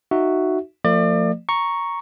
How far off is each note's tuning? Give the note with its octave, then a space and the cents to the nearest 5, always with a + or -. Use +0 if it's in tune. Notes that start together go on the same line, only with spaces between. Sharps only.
D#4 -10 F#4 +0 E5 +0
F3 +0 A3 +45 D5 +35
A#5 +0 C#6 +0